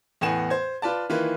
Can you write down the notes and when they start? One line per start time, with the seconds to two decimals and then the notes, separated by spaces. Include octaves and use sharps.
0.21 E2 A2 B3 F#5 G#5 E7
0.50 C5 G#6
0.82 F4 B4 D5 A5
1.09 D#3 E3 A#3 F4 B4